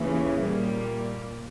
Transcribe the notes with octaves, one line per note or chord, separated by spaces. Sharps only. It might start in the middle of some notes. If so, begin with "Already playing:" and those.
Already playing: D#2 C#3 E3
A#2 G3 A#3